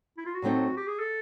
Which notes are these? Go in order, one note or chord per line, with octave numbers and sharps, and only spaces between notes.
E4
F4
F#4
A2 F#3 A3 C4 D#4
G4
G#4
A4